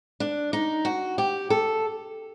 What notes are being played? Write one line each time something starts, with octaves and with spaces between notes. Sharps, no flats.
D4
D#4
F#4
G4
A4